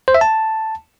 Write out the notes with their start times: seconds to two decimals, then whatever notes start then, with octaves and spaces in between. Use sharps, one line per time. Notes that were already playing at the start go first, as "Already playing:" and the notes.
0.08 C5
0.15 E5
0.21 A5